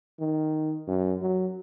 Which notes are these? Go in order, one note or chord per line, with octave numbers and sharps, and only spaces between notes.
D#3
F#2
F#3